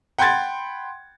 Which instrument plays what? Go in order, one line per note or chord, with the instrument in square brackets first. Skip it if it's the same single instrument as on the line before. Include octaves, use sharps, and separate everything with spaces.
[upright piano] F#5 G5 B5 C6 G#6 A6